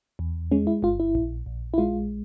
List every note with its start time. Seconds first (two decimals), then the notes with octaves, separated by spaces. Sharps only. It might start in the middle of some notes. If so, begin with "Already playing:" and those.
0.19 E2
0.51 G#3 C#4
0.67 E4
0.83 G1 F4
1.00 E4
1.15 A#1
1.46 A#1
1.74 E4
1.78 G#3 F4